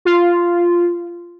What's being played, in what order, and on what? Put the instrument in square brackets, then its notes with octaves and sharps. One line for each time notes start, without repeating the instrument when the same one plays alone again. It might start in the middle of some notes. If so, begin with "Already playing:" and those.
[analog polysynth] F4